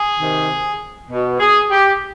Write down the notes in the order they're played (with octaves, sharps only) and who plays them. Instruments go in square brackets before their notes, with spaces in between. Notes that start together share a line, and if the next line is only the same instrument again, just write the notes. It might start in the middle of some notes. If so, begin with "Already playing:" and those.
Already playing: [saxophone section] G#4
C3 D#3
B2
G#4
G4